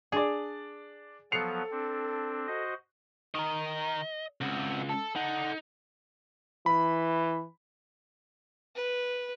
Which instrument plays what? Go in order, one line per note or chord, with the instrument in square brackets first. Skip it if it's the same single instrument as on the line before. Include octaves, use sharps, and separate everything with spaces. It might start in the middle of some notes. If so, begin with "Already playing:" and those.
[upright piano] D4 D5 [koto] G#4
[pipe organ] F3 F#3 B3 [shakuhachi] A4 [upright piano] C7 C#7 F7
[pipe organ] C4 D4
F#4 C5 D#5
[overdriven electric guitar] D#3 A#4 [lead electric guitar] D#5
[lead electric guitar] C#2 [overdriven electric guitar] C4 F#4
[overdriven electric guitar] A4
[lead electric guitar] D#4 [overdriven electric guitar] A4 F#5
[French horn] E3 [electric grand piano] B5
[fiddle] B4